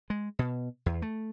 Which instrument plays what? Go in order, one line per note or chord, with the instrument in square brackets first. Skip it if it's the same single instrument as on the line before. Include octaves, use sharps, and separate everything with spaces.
[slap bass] G#3
B2
E2
A3